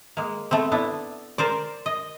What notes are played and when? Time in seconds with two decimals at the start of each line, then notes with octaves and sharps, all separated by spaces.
0.17 G#3 A#3
0.51 A3 B3 C4
0.72 B3 D4 E4
1.38 A#4 C5 D5
1.86 D#5